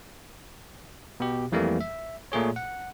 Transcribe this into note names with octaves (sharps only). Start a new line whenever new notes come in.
B2 G4
F2 E3 G3 A3 A#3
E5
A#2 A3 G#4 C#5
F#5